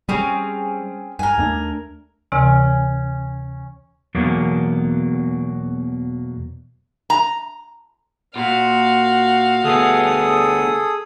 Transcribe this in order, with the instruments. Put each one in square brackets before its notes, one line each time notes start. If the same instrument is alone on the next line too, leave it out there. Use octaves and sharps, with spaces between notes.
[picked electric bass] G3 [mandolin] C4 C#4 G#4
[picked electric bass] G2 [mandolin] A#4 G#5
[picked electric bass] D#2 A3 D4
[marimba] D2 C3 E3 [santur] C#4
[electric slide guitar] E2 B2 F#3 A#3
[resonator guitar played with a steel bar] A#5
[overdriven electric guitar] A#2 [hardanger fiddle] F#4 F5
[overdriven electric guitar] D2 B3 [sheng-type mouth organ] G#4 A4 D#6